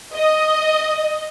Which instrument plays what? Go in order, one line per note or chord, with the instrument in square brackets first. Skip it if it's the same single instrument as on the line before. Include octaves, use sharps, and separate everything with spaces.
[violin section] D#5